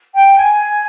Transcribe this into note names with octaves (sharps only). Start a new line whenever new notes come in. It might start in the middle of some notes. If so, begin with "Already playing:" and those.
G5
G#5